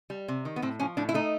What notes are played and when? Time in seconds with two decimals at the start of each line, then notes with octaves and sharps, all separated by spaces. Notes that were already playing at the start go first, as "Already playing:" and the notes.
0.10 G3
0.28 C3
0.45 D#3
0.56 B3
0.62 A2 C4
0.80 F3 C#4
0.97 A2 D4
1.09 E4
1.14 A3 D#4